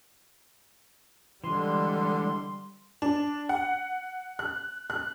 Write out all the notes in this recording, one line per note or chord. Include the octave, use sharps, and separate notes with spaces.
D3 E3 G3 G#3 C6
D4
F#5
F#6
F#6